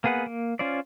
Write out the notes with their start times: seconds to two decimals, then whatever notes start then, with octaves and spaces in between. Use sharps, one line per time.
0.04 A#3 B3 G#4 B4 F#5
0.26 A#3
0.59 C#4 F4 C5 D5